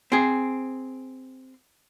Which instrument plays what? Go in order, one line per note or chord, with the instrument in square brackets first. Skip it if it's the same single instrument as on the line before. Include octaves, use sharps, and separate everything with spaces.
[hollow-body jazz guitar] C4 G#4